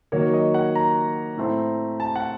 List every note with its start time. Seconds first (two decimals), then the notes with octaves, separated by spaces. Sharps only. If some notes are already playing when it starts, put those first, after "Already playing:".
0.12 D#3 F#3 A#3 C#5
0.34 D#5
0.54 F#5
0.75 A#5
1.37 A2 A3 C4
2.00 A5
2.16 F#5